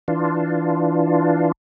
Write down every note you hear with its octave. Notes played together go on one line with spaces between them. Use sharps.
E3 D4 F4